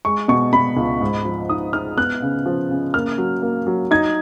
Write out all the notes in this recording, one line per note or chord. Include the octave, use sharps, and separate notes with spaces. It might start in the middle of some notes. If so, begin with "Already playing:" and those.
G#3 C#6
B2 C#6
B2 B5
C#2
G#2
F3
D#4 D#6
D#4 F6
B3 F#6
C#3
F3
C#3
A#3 F6
F#3
A#3
F#3
D#4 G#6